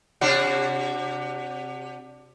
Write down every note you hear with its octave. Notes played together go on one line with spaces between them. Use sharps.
C3 D4 F#4